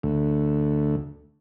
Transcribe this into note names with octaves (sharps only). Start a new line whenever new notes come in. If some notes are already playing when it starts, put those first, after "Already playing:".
D2